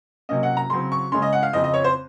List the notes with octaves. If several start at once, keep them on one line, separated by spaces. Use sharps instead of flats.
C3 F#3 A#3 C#4 D#5
F#5
A#5
C#3 F#3 C4 C6
C#6
C#3 G#3 C#4 C6
D#5
F#5
F5
F2 C#3 F3 C4 D#5
D#5
C#5
C5